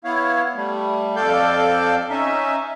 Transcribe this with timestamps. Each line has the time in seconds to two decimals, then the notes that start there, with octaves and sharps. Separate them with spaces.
0.04 B3 E4 C#5 F5
0.55 G3 A3
1.16 F2 A4 D5 F5 G6
2.10 C#4 D#4 E5